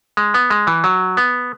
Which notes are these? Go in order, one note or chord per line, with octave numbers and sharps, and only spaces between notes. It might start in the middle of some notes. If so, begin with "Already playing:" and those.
G#3
B3
G#3
E3
F#3
B3